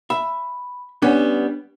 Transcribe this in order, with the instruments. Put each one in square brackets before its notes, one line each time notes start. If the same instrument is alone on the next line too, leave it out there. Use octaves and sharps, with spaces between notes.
[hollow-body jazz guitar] E5 [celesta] B5
[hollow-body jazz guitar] G3 B3 C#4 [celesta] D4